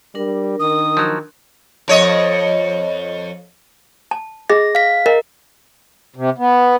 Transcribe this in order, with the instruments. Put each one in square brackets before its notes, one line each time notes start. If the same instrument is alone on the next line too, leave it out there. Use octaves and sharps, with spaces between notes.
[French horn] G3 [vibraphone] D4 A#4
[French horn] D#3 [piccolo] D#6
[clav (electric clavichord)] F3 F#3
[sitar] F2 C#5 D#5
[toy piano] A5
[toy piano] G#4 D#5 [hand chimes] A#6
[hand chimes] F5 B6
[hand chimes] A#4 [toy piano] D#5
[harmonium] C3
B3